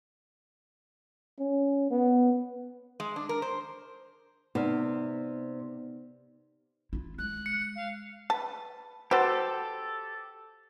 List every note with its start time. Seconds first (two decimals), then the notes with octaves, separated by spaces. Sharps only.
1.39 C#4
1.90 B3
3.00 G#3
3.16 D4
3.29 A#4
3.42 C5
4.55 C3 B3 D#4 D5 F6
6.93 E4 F4
7.18 G#3 F#6
7.46 C#7
7.76 F5
8.30 B4 A5
9.11 F#4 G4 A4 B4 C5